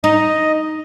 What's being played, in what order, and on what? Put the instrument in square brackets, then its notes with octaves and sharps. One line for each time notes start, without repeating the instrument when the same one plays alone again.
[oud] D#4 [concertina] D#5